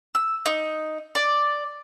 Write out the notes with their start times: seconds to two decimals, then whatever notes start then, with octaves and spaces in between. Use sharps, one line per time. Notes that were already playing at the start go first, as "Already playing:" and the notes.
0.15 E6
0.46 D#4
1.15 D5